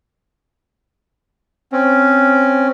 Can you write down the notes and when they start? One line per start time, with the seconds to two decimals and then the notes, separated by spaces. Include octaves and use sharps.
1.72 C4 C#4